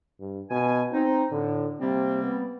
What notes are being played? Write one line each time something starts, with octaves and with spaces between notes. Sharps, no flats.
G2
B2 G#5
C4 D#4
A2 D3
C3 G3 A#3 C4
B3